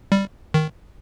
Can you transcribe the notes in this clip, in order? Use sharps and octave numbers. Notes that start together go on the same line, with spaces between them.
G3
D#3